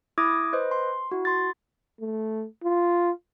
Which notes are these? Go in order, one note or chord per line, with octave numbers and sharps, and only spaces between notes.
E4 D6 D#6 G#6 A#6
B4 C5 D#5
C6
E4 F#4
C6 A6
A3
F4